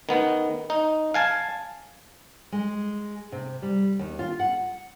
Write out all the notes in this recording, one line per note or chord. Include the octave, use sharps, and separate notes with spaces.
D#3 B3
D#4
F5 G#5 A5
G#3
C3
G3
D#2
F4
F#5